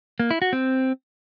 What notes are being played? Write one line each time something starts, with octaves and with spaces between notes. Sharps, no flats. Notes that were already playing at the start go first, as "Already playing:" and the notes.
A#3
E4
F#4
C4